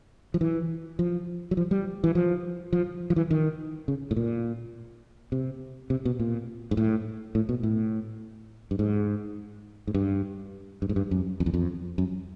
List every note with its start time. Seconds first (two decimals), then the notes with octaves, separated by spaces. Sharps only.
0.34 F3
0.41 E3
0.99 F3
1.51 F#3
1.57 F3
1.71 G3
2.04 E3
2.15 F3
2.73 F3
3.10 F3
3.16 E3
3.31 D#3
3.88 C#3
4.11 A2
4.16 A#2
5.32 C3
5.90 C3
6.05 B2
6.19 A#2
6.71 G#2
6.77 A2
7.35 A2
7.49 B2
7.63 A2
8.71 G2
8.79 G#2
9.87 G#2
9.94 G2
10.82 G2
10.89 G#2
10.96 G2
11.11 F#2
11.40 F2
11.46 E2
11.54 F2
11.98 F#2